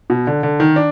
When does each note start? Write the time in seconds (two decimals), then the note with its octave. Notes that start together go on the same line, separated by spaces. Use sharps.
0.10 B2
0.27 D3
0.43 D3
0.60 D#3
0.76 D4